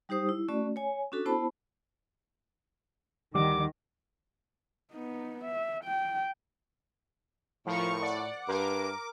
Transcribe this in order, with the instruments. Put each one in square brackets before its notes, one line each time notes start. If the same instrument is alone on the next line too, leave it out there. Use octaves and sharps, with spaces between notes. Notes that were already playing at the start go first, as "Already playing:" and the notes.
[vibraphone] G3 D#4 G4 C5 D#6
E4
A3 C#4 F#4 D5
C#5 G#5
C#4 D4 F#4 A4
B3 E4 C5 A5 B5
[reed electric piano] D2 G3 F#5 [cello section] D#3 [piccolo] D6
[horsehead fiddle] B3 D#4
E5
G5
[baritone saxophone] A2 [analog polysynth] F3 [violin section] A#4 F5 C#6
[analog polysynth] D5 [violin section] F#5
[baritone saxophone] G2 [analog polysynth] A#4 [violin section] D6